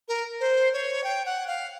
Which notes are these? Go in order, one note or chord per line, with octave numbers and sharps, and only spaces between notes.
A#4
C5
C#5
G5
F#5
F5